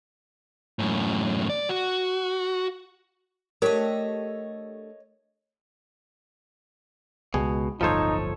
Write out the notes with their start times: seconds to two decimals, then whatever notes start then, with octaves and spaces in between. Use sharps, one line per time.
0.79 F#2 A2
1.49 D5
1.69 F#4
3.62 A3 D4 G4 A#4 C#5 D#5
7.34 C#2 B2 G3 G#3 G#4
7.81 D1 G1 F3 D#4 F4 A4 C5 C#5